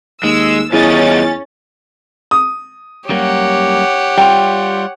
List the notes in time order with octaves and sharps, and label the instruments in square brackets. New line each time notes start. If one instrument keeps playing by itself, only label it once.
[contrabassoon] D#2 [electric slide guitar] G#3 [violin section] E6
[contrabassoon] E2 [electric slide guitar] G2 F4 D#5 [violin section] C#4 A6 [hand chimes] E4 G#4
[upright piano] D#6
[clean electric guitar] F#2 G3 A#3 [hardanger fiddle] G4 [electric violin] C#5 F#5
[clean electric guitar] G3 F4 [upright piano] G5